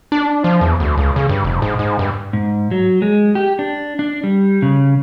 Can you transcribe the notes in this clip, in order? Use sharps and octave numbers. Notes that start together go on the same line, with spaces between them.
D4
F3
E2
D2
C#2
C#3
G2
F1
G#2
G#2
G2
G#2
F#3
G#3
G4
D4
D4
G3
C#3